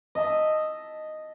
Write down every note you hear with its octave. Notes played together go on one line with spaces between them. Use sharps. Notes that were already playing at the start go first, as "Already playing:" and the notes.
D#5 E5 A5